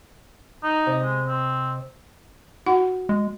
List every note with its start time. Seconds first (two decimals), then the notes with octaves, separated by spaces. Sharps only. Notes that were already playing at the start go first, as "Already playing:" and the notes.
0.63 D#4
0.87 C3 D#5
1.03 G#3
1.27 C4
2.66 E4 F#4 F#5
3.09 G#3